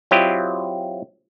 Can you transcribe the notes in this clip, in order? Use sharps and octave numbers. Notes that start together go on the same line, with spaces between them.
F#3 C4 E4 F4 G4 D#5